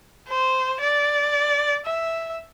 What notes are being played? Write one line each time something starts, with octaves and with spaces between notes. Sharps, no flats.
C5
D5
E5